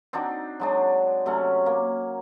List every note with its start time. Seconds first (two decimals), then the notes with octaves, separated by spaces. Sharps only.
0.13 C4 D4 D#4 F#4
0.60 F#3 G#3 D4
1.26 C3 F#3 A3 C#4
1.66 A#3